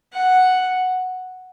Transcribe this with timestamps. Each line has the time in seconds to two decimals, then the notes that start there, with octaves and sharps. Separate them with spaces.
0.12 F#5